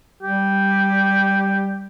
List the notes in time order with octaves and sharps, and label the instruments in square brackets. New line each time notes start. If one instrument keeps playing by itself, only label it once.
[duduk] G3 [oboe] G4